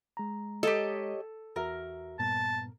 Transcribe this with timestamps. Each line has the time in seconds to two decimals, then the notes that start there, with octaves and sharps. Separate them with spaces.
0.17 G#3 A#5
0.63 G4 A4 C#5 D#5
1.56 E2 F#4 A#4 E5
2.19 G2 A#2 B3 A5